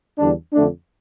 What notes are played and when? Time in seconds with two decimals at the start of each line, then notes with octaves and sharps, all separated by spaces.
0.18 E2 D3 G3 D4
0.53 F2 D3 A3 D4